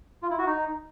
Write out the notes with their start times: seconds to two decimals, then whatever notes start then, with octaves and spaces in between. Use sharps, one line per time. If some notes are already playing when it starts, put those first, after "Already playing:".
0.23 F4
0.31 E4
0.38 F#4
0.46 D#4